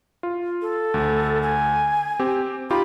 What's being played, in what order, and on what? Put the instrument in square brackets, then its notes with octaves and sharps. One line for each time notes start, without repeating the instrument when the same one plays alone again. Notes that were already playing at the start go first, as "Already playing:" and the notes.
[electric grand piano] F4
[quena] A4
[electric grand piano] D2
[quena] G#5
[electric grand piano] C4 G4
[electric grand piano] D#4 F4 G4 [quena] B5